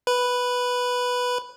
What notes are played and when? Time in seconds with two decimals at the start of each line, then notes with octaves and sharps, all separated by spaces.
0.07 B4